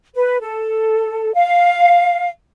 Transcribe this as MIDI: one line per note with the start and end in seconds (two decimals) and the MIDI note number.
0.15 0.37 71
0.42 1.33 69
1.34 2.27 77